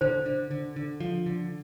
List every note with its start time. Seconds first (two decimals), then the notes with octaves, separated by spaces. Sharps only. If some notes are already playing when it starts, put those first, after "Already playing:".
0.01 D3 C5
0.26 D3
0.51 D3
0.76 D3
1.00 F3
1.26 D3